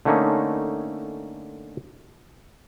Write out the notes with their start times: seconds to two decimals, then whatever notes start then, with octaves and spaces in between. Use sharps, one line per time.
0.05 D3 A3 A#3 C#4 D#4